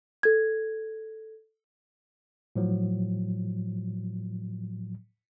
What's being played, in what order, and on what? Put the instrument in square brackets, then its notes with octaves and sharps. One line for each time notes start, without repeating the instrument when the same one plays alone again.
[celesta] A4 G#6
[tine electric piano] A2 F3 F#3